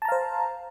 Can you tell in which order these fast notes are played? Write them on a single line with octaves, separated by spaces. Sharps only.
A5 A#5 F5 C5